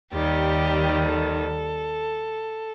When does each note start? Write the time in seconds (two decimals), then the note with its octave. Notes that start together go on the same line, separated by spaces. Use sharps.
0.12 D#2 D#3 G3 G4
1.05 A4